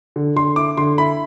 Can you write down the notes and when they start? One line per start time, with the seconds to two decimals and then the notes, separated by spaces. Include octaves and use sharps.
0.16 D3
0.36 D3 C6
0.56 E4 D6
0.77 D3 C6
0.98 E4 B5